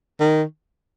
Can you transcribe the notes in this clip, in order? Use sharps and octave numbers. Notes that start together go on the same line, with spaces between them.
D#3